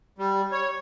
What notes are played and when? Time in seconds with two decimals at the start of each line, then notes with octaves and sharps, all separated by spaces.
0.19 G3
0.52 C#5